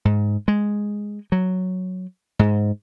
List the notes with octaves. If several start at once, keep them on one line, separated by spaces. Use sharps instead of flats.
G#2
G#3
F#3
G#2